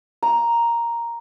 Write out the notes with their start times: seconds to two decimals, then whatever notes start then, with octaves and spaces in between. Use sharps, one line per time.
0.23 A#5